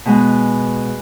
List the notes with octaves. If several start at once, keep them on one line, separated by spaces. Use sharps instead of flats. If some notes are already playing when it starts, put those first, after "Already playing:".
B2 G#3 B3